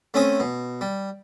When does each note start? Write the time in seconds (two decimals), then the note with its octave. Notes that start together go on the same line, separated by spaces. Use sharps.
0.14 A3 C4 C#4 G#5 D#6
0.40 B2
0.81 G3